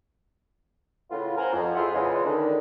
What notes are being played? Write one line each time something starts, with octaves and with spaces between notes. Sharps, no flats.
A2 C#3 B3 F4
A#4 C5 F#5 G#5 A#5
F2
E4 F4 G#4 C5 E5 F#5
A#2 C#3 E3 G#3
D3 D#3 D4